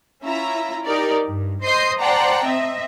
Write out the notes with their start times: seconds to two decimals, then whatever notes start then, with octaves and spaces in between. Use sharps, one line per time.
0.22 C#4 E4 F4 E5 A#5
0.86 D#4 G4 A#4 D5
1.27 G2
1.63 C5 D#5 C6 D#6 G6 C7
2.00 C5 D5 F#5 G5 A5 A#5
2.45 C4 D#5 E5